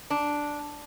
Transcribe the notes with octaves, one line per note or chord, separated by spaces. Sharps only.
D4